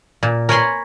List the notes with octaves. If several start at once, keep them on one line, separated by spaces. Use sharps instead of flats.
A#2
A#4 C#5 G#5 B5 C6